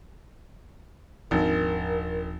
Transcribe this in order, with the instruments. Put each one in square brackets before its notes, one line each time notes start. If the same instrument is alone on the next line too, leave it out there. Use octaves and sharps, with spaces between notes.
[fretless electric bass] D#1 F3 D4 [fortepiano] G#1 [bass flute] A#4